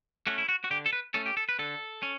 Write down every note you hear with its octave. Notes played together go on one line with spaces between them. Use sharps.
A3 C#4 F#4
E4
F#4
F#4
D3 G4
A4
B4
A3 C#4 A4
G4
A4
B4
D3 A4
C#4